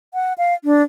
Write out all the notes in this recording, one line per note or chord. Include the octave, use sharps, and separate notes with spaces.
F#5
F5
D4